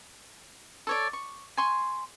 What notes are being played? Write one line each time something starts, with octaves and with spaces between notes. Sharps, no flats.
A4 C#5 D5
C#6
G#5 C6 C#6